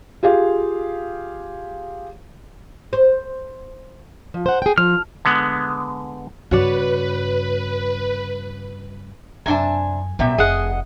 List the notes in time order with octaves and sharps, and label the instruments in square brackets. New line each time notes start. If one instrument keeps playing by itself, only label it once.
[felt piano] F4 G4 G#4 F5
[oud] C5
[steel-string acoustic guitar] F3
C5 F#5
G#4 G5
[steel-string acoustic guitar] F3 [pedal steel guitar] F6
[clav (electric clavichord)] D3 G#3 B3
[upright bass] G2 C#3 [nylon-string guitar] F#4 C#5 D5 [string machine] B4
[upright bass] F#2 [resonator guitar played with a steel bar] C3 D4 A5 [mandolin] G#5
[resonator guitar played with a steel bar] F#2 G3 E5 [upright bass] B2 B3
[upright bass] F1 [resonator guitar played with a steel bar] G#4 [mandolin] D#5 F#5